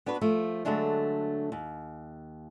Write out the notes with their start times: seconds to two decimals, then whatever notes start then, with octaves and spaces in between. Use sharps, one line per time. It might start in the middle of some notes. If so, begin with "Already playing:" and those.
0.06 B3 D4 F#4 B4
0.21 F3 A3
0.65 D3 F#3 G#3 A3 D4
1.52 D#2